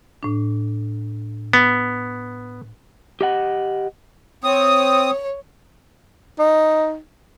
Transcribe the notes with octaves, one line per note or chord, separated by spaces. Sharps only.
A2 D4
B3
G4 D#5 F#5
C4 C#5 D#6
D#4